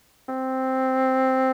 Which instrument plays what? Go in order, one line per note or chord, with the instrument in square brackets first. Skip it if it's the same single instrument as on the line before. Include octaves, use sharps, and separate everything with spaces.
[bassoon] C4